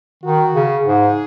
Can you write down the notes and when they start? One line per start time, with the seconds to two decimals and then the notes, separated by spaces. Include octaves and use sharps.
0.23 D#3 F#4
0.55 C#3
0.86 G#2 G#4